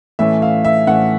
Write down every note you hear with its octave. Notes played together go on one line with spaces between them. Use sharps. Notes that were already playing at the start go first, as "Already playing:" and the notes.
A2 E3 A3 C#4 E5
F5
E5
A2 E3 A3 C#4 F#5